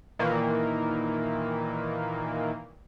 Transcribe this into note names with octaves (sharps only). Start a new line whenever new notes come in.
A#2 D#3 E3 A#3